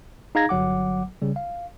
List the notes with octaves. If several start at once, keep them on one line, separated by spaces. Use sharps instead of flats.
D#4 G#4 F5 A#5 G#6 A#6
G1 F#3 F#5 D6
C#3 G3
F5